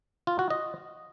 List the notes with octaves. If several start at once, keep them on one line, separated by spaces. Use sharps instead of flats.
F4
F#4
D#5